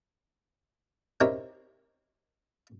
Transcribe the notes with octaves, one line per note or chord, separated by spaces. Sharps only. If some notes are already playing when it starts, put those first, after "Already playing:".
C4 D#4 E4 G4 A#4 C#5